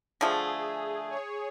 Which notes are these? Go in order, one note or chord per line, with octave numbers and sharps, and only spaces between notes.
D3 F3 A3 G#4
C#5